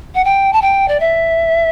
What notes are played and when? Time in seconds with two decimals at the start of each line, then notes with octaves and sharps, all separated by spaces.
0.15 F#5
0.25 G5
0.53 A5
0.62 G5
0.88 D5
1.00 E5